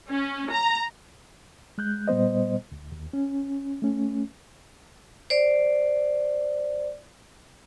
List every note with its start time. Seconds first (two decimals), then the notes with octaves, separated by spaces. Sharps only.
0.10 C#4
0.51 A#5
1.78 G#3 F#6 G6
2.08 A#2 G3 B3 C5 D#5
2.72 D2
2.92 D#2
3.13 C#4
3.82 A3 C#4
5.30 C5 D5